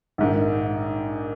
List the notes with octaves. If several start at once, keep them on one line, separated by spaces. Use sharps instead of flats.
A#1 G#2 D#3